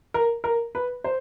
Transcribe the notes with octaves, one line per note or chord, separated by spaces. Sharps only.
A#4
A#4
B4
C5